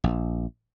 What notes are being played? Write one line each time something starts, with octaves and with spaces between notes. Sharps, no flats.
A#1